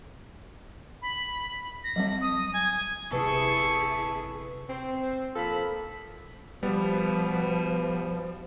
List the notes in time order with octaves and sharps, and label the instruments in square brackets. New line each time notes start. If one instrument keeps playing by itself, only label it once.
[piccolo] B5
A#6
[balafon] F#3 G3 C4
[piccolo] D#6
G#5
[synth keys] G1 C3 B4 [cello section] E4 G#4 [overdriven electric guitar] A4 [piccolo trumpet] C#6
[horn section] C4
F3 A#3 A4 B5
[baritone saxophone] B2 [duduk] F3 [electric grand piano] G3 B3